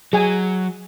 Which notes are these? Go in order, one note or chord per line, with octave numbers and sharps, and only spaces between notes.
F#3 G#4 G#5